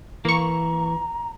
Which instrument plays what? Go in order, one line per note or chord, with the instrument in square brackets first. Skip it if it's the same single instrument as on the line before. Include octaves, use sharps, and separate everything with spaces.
[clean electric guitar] E3 [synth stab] A#3 C#6 [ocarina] A#5